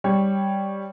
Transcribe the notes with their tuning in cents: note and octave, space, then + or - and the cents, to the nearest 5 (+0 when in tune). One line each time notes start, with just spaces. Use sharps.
G3 +0 C#5 +0